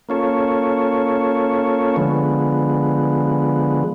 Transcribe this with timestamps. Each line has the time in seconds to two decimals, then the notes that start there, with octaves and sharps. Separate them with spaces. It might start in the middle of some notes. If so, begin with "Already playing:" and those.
0.09 A#3 C#4 F4 A4 C#5
1.96 D3 F3 G#3 B3